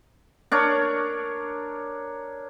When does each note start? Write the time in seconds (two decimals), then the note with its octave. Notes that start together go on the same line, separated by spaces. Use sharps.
0.51 D4 A#4 C#5